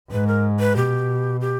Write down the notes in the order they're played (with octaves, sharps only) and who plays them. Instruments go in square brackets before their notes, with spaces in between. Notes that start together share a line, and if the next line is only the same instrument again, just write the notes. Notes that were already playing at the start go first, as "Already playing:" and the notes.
[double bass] G#2 [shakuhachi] B4
[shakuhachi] A#4
B4
[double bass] B2 [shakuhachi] G4
[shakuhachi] G4